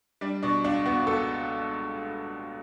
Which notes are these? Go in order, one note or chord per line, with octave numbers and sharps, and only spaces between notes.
G3 D4
B2 D4
C#2 D4
B3 F#4
C#2 A4